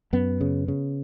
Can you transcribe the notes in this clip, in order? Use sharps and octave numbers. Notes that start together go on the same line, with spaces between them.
F#2 B3
C#3
C#3